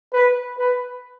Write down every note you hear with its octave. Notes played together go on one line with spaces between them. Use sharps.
B4
B4